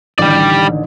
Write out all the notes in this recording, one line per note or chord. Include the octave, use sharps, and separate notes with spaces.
A1 D3 D#3 G3 D5